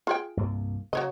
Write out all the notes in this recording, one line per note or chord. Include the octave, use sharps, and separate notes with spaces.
F4 G#4 G5
C2 G2 A#3
C#3 F#3 C#5 D#5